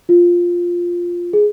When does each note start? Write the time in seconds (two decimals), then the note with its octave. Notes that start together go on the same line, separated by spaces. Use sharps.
0.09 F4
1.33 G#4